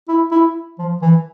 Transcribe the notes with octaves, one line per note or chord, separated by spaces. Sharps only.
E4
E4
F3
E3